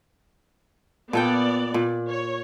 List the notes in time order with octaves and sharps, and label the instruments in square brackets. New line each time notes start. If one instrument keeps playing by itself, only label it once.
[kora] A#2 A4 G5 [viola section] B3 D5
[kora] A#2
[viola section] C#5